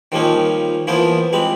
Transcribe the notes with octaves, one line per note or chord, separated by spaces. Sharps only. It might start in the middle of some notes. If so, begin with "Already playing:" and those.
D#3 F3 G3 A#3 C#4 D#4
E3 F3 A#3 B3 C5
G3 G#3 C4 B5